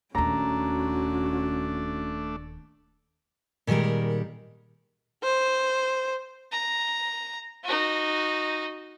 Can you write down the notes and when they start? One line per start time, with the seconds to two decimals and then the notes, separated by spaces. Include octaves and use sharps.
0.15 D#1 D#2 A3 C#4 D4 F#4 A#5
3.67 A#2 D#3 G3 G#3 A#4
5.23 C5
6.52 A#5
7.64 D#4 F#4